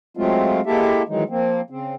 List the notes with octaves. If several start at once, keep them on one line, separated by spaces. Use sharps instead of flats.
F#3 G#3 A3 C4 F4
G#3 A#3 E4 G4 A4 E5
D#3 E3 F#3 G#3 D#4
F3 A#3 C4
C#3 C4